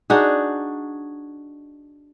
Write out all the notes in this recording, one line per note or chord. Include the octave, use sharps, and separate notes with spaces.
D4 D#4 F#4 G#4